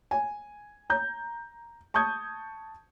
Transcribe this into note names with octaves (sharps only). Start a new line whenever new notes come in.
G#5
A#5 G6
A5 C#6 D#6 G6 G#6